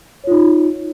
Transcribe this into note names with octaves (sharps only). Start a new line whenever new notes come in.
D#4 F4 C#5